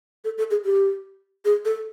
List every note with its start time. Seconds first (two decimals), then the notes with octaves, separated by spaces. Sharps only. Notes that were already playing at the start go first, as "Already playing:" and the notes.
0.25 A4
0.38 A4
0.51 G#4
0.65 G4
1.45 G#4
1.65 A4